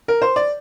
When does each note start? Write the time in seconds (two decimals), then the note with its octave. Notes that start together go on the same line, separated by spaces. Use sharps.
0.08 A#4
0.22 C5
0.36 D5